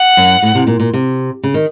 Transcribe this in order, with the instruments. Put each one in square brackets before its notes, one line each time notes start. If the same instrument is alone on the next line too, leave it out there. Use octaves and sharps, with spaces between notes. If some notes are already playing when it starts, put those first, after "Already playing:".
Already playing: [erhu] F#5
[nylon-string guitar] F#2
A2
C3
A#2
A#2
C3
C#3
D#3